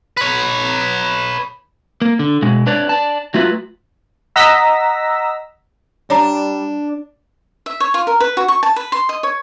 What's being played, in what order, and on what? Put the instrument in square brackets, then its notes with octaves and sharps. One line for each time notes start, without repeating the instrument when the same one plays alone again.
[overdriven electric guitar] B4 C#5
[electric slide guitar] A#3
D3
B2 G#3
D4 B4 C#5 D5
D5 A5
F#3 A3 F4 F#4 B4 E5
[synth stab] D#5 F#5 A#5 E6 A#6 B6
[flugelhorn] G3 [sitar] D4 [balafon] C#5 A#5
[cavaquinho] E5
C#5
F4
A#4
B4
F#4
C#6
A5
B4
C6
D#5
C#5